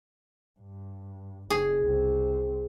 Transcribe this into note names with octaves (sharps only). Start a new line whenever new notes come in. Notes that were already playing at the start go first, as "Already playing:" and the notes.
G2
F#1 G#4
C2 C4